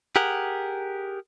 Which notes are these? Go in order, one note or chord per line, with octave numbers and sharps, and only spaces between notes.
G4 G#4 A#4 F#5